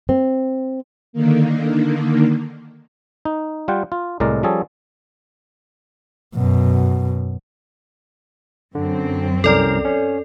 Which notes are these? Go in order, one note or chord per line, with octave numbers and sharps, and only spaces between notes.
C4
D3 D#3 A#3
D#4
G3 F4 F#5 G5
F4
C2 A2 G#3 A#4 D5
F3 G3 C#4 G#4 A4
F#2 B2
F#2 D3 C4
C2 C#4 A4 A#4 D5
C#4